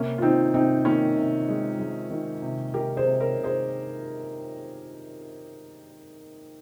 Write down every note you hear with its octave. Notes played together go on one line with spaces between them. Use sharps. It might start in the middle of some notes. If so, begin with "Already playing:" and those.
Already playing: C3 A#3 C#4
F4
D#3 C4 D#4
C3 C4 D#4
D#3 A#3 C#4
C3
G#3
G#3
D#3
C3
C3 G4 A#4
G#4 C5
C3
A#4 C#5
C3
G#4 C5